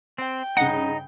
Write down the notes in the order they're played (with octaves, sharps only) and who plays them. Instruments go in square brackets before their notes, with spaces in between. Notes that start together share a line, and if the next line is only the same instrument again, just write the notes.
[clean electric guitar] C4 [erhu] G5
[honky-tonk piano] G2 C#3 [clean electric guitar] D#4 [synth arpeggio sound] F#5